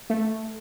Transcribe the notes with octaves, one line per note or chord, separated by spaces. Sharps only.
A3